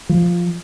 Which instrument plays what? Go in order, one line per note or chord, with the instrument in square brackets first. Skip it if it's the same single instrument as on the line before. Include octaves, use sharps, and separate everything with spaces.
[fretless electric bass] F3